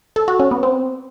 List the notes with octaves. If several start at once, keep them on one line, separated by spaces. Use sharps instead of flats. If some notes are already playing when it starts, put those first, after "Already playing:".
A4
F#4
C#4
B3
C4